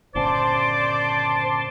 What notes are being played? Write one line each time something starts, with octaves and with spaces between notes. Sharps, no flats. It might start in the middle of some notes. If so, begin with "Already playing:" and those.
G1 A#2 C#3 C5 D5 A5 C6 D6